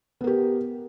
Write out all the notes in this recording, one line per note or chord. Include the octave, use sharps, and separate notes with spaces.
B3 G4 A#4